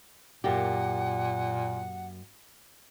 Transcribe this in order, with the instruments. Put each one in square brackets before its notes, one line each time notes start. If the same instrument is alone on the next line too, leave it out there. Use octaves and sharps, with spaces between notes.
[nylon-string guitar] F#2 A#3 G4 [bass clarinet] A#2 [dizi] F#5